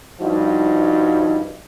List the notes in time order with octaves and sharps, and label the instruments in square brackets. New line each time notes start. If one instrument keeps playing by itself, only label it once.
[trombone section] C2 G2 F3 D#4 F#4